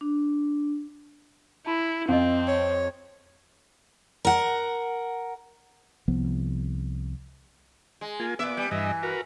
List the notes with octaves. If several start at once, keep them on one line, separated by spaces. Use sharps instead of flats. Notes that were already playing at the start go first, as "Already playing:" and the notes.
D4
E4 A5 B5 C6
F2 C4 D#5 F5
C#5
A#4 F#5
C2 F3 B3
G#3
A#3 F4 G#5
A#2 B3 E5 D6
G3
G2 E3 D#5 E5
F#4 A#4 B4